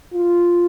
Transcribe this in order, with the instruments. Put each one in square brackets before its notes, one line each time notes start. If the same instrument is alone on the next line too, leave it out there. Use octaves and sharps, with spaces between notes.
[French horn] F4